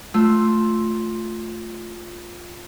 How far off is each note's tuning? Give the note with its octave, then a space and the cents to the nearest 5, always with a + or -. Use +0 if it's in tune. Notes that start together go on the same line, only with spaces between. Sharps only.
A3 +0 F4 +5 E6 +0